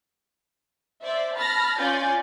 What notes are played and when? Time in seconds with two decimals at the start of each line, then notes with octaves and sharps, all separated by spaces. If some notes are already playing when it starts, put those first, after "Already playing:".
1.03 C5 D5 E5
1.37 A5 B5 F6 A6 A#6
1.79 C#4 F4 D5 G#5 G6 A6